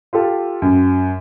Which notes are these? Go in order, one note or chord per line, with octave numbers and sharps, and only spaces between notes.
F4 G4 A4
F#2